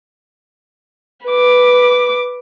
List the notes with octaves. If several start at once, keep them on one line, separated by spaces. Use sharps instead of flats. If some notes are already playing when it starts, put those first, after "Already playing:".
B4 D6